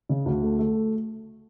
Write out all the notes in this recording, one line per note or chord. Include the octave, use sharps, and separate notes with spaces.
C#3
D2
A3
A3